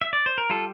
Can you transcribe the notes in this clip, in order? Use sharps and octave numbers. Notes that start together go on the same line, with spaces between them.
E5
D5
C5
A#4
G3 F4 A4